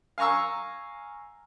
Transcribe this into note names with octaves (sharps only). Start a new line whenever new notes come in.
F5 G#5 A#5 C#6 E6